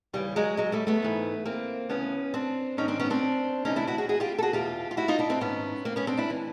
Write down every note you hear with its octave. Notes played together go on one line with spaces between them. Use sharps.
D#2 C#3 E3 G3
F#3 G#3
F#3 G#3
G3 A3
A3 B3
G#2 E3
A#3 C4
D2 C#3 E3 B3 C#4
C4 D4
G#2 D#3 C#4 D#4
C4 D4
B3 C#4
C4 D4
D2 C3 E3 C#4 D#4
D4 E4
E4 F#4
F#4 G#4
F#4 G#4
F4 G4
A4
F#4 G#4
E2 B2 F4 G4
F4
E4 F#4
D#4 F4
D4 E4
C4 D4
G#2 D#3 B3 C#4
A#3 C4
B3 C#4
C4 D4
D4 E4
E3